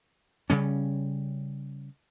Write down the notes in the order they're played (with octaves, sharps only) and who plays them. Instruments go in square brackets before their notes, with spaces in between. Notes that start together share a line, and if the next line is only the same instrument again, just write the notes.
[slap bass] C#3 G3 C#4